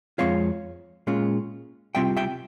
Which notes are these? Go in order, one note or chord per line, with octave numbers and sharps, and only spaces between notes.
F2 E3 G#3 C4 F4 C#5 F5
A#2 G#3 C#4 F4
C3 G3 C4 F4 E5 G5
E5 G5